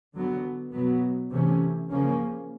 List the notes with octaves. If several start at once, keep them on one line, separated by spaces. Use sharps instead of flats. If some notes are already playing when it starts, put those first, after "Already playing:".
D3 F#3 B3
B2 F#3 B3
C3 E3 A3 C#4
C#3 F3 A#3 C#4